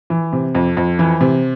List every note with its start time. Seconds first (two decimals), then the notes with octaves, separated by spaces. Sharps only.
0.10 E3
0.33 C3
0.55 F2
0.77 F2
0.99 E3
1.21 C3